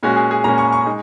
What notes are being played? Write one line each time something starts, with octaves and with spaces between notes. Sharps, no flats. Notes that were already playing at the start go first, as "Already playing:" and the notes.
A#2 G#3 C#4 F#4
G#4
G#4
A#2 G#3 C#4 A#5
C#6
C#6
G#3 D#4